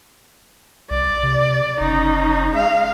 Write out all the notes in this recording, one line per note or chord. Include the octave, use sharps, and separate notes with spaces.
C2 D5
C3
F#1 C#4 D#4
G#3 F5